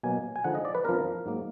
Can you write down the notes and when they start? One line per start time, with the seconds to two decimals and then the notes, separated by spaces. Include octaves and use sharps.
0.03 B2 F#3 A#3 G#5
0.36 G#5
0.44 D3 F3 G#3 D#4 F#5
0.55 D#5
0.65 D5
0.75 B4
0.85 F2 F3 B3 D4 A#4
1.26 G#2 F#3 A#3